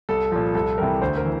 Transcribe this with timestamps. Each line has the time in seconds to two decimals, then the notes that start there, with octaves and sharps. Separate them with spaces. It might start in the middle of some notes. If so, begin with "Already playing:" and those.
0.09 C2 A4
0.32 A#2 F3
0.55 C2 A4
0.78 C3 E3 G3 A#4
1.02 D2 C5
1.17 A#4
1.25 E3